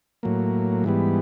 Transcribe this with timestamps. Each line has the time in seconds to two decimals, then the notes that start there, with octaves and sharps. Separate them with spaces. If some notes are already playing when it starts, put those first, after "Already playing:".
0.23 A2 F#3 A#3
0.84 G#2 E3 G3 B3